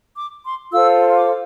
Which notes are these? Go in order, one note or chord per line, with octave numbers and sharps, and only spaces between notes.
D6
C6
F4 A4 C5 E6
D6